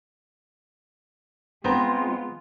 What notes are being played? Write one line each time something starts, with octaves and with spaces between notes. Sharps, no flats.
G#3 B3 C4 F4 A#5